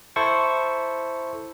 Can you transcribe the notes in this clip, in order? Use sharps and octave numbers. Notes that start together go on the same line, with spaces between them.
E4 A4 C5 C#6